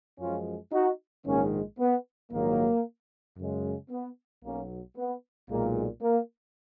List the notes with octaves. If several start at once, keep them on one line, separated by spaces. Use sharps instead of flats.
F#2 F3 G#3 C#4 F4
D#4 F#4
A#1 G#2 D#3 G#3 A#3 C#4
B3
A#1 G#2 D#3 F#3 A#3
F#2 C#3 G#3
B3
B1 B2 F#3 A#3 C#4
B3
B1 A#2 G#3 A#3
A#3